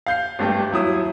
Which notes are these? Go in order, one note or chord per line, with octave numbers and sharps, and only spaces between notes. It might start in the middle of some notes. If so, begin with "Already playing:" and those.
F5 G6 C7
G#1 G2 A3 G4
D#2 F#3 E4 D#6